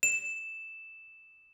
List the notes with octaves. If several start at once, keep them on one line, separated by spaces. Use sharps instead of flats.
E7